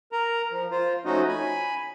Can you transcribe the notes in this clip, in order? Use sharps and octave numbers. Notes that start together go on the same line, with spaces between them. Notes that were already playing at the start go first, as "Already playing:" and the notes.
A#4 A#5
F3
F4 C5
F3 A3 C#4 D#4 F#4 D#5
G#5 B5